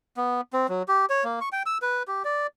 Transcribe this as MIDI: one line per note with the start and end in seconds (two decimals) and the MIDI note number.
0.17 0.41 59
0.53 0.67 60
0.69 0.83 54
0.88 1.06 67
1.10 1.24 73
1.24 1.39 58
1.41 1.49 85
1.52 1.63 79
1.66 1.78 88
1.82 2.03 71
2.08 2.23 67
2.25 2.47 74